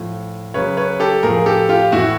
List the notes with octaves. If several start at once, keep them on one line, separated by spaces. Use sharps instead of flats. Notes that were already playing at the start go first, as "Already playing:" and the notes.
Already playing: A2 F3
C#3 F#3 B4 C#5
B4 C#5
G4 A4
A2 F3 G#4 A#4
G4 A4
F4 G4
A2 E3 E4 F#4